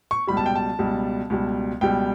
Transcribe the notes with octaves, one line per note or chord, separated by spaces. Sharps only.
C#6
C#2 B2 G3 B5
A5
G5
A5
C#2 B2 G3
C#2 B2 G3
C#2 B2 G3 G5